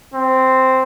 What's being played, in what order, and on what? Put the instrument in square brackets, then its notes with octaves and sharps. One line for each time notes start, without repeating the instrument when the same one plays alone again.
[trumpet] C4